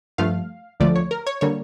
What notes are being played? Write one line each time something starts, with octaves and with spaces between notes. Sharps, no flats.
G2 F3 A3 F5
D2 D3 F3 A3 D5
C#5
A#4
C#5
D3 G3 A#3 C#5